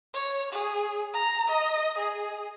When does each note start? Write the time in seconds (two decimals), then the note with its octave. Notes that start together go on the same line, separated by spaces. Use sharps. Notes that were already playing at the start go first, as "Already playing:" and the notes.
0.14 C#5
0.53 G#4
1.14 A#5
1.48 D#5
1.98 G#4